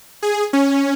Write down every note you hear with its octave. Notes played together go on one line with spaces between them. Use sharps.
G#4
C#4